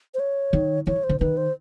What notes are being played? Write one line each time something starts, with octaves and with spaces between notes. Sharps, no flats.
C5
C#5
D#3
E3 C#5
C5
D3
D#3 B4
C5